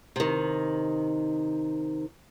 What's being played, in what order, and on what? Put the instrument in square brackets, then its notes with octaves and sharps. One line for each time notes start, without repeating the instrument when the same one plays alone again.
[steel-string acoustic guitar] C3 D#3